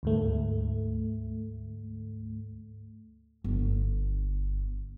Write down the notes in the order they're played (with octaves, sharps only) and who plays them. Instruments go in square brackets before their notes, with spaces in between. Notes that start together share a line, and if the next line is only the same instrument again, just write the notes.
[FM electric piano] D2 G#2 A3
[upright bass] G1